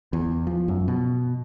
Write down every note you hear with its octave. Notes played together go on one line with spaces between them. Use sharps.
E2
F3
F#2
B2